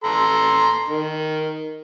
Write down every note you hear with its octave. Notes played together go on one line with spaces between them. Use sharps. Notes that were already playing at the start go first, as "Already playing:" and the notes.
A4 A#5 C6
D#3